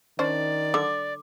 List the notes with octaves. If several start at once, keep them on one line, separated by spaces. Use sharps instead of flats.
D#3 C#4 D4 C5 D5
D3 D6